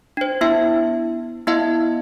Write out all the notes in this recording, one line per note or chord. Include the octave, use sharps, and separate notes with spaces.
D4 C5
B3 D4 E4 E5
B3 E4 D#5 F5